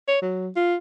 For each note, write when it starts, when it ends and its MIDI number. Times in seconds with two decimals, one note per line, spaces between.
0.08 0.18 73
0.22 0.48 54
0.56 0.75 65